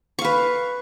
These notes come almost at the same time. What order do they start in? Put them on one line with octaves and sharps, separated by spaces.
C#6 F5 B4